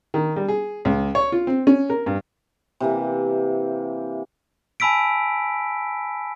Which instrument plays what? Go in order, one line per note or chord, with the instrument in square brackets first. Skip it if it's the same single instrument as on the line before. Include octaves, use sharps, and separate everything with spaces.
[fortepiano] D#3
G3
G#4
C#2
C#5
F4
C4
C#4
A#4
G2
[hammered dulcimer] C3 E3 A#3
[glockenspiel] G#5 A5 B5 E6 B6 D7